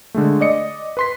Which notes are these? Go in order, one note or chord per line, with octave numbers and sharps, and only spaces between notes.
D3 G#3 A3
D5 D#5 C#7
B4 C6 B6